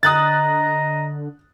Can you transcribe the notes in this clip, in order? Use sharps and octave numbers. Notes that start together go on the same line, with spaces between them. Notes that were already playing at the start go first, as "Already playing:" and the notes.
D3 D#5 A#5 D#6 F#6 A6